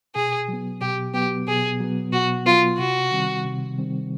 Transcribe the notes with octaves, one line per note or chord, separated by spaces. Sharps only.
B2 G#4
F#3 B3
B2 G4
F#3 B3 G4
B2 G#4
F#3 B3
B2 F#4
F#3 B3 F4
C3 F#4
D#3 G3 C4
C3
D#3 G3 C4